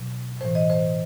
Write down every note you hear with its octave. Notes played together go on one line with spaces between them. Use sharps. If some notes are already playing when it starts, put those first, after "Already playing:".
Already playing: B2 F#3
A2 E3 C5
D#5
C5